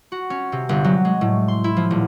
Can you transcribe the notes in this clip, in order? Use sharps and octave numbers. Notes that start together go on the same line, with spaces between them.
F#4
C#4
C3
G1
F#3
G#3
A2
C6
E4
F3
D#1